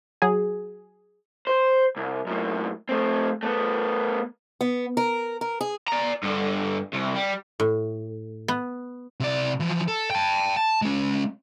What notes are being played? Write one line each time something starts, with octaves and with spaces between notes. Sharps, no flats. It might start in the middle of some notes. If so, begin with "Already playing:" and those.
F#3 G#4
C5
C2
F#2 A2
A3 C4
A3 B3
B3
A#4
A#4
G#4
D5 A#5
G2 D3
C2
G3
A2
B3
C3 D5
E3 F3
A4
G5 A5
A5
G#3 C#4